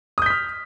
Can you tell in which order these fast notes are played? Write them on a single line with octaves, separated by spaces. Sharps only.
D#6 G6 B6 F6